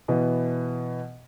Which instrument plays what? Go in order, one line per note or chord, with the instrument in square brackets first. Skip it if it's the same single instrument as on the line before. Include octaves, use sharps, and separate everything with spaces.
[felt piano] B2 E3 B3